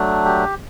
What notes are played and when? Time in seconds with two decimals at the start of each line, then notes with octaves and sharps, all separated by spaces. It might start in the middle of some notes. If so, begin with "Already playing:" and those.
Already playing: F#3 A3 D4
0.25 G4